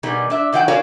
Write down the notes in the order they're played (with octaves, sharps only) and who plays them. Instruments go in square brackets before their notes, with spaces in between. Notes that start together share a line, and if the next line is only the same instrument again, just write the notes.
[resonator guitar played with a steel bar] B2 D#3 G3 B3 G#4
D4 E5
E2 D#3 F#3 F#5 G5
F#4 A#4 C#5 D5 F5 G#5